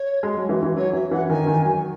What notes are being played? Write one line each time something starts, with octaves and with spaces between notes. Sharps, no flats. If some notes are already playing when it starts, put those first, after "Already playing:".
Already playing: C#5
G#3
F#3
E3
E3
F#3 C#5
E3 E5
E3 F#5
D#3 G#5
D#3
F#3